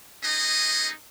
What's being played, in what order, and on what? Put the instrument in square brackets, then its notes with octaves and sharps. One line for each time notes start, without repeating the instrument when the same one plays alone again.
[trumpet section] A3 C#4 D#4 G#4 D#5